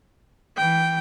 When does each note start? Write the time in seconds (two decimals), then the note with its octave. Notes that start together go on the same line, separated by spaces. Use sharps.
0.57 E3 G5